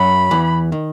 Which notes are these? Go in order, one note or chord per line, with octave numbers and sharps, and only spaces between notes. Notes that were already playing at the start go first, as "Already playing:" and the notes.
Already playing: F#2 F#3 B5
E2 E3
D#3